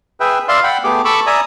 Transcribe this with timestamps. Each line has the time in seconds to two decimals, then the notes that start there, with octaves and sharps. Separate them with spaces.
0.20 G#4 B4 E5 G5
0.48 D5 E5 F5 C6
0.64 F#5 G5 B5
0.84 A3 B3 G4 G#4 D6
1.05 A4 B5 C#6 D6 E6
1.27 D5 E5 G#5 A#5 D#6